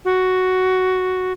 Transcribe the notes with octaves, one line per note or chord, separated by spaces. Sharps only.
F#4